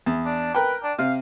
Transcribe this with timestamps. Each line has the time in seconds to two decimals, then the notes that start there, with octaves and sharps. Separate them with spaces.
0.06 E2
0.26 D4
0.54 A#4 B4 G5
0.83 D4
0.99 C3 F5